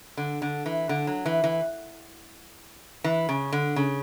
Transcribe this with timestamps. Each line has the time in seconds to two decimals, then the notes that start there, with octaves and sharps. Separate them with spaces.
0.17 D3
0.42 D3
0.66 E3
0.89 D3
1.07 F#3
1.26 E3
1.44 E3
3.04 E3
3.29 C#3
3.53 D3
3.76 C#3